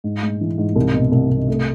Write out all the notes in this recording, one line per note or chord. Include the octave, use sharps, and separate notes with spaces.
G#2
G#3
E3
G#2
C2
B2
C2
C2
A3